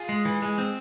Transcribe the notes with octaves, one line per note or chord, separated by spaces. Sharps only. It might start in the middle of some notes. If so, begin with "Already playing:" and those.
Already playing: F4 G#4
G#3
E3
G#3
C4